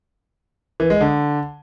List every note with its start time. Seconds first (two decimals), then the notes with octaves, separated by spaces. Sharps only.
0.80 E3
0.90 G#3
1.01 D3